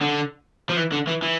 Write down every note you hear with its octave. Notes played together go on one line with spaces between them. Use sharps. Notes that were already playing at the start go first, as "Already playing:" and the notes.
D3
F3
E3
D3
E3
E3